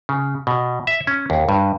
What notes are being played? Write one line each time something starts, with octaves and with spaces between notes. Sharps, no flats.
C#3
B2
E5
C#4
D#2
G2